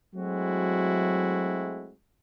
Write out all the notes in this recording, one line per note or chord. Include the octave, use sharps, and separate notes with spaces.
F#3 G#3 A3 C4 E4 F#4